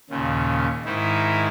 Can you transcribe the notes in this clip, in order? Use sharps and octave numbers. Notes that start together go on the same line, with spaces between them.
D#2 A#2 C#3
G#2 D#3 D#4 E4